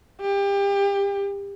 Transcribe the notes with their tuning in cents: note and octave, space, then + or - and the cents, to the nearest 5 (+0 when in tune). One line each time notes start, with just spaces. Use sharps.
G4 +30